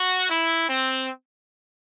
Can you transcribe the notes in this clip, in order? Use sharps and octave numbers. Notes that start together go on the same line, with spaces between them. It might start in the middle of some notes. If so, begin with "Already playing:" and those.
Already playing: F#4
E4
C4